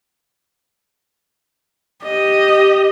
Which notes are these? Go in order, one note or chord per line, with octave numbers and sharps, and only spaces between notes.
G4 D#5